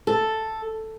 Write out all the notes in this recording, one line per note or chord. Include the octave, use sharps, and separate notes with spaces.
A4